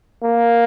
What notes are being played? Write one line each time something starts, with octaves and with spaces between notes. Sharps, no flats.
A#3